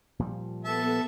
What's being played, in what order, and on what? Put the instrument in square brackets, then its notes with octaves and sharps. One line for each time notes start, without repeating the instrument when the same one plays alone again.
[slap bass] A#2 F3 G3
[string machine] B3 A4 [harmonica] E5 A5